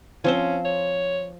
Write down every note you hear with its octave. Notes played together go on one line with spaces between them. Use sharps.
F3 C4 C#4 C5
C#5